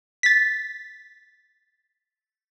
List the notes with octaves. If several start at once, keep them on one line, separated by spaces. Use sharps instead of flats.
A6 B6